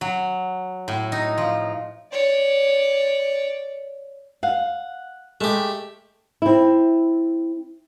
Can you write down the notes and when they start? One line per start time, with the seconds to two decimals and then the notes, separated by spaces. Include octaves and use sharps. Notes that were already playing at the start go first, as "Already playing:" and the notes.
0.01 F#3
0.88 A2
1.12 D#4
1.38 F3
2.12 C#5 D5
4.43 F5 F#5
5.41 G#3 A3 G4
6.42 C4 E4